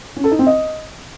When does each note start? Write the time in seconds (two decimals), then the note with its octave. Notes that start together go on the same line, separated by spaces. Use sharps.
0.16 C#4
0.24 A4
0.32 D#4
0.39 C4
0.47 D#5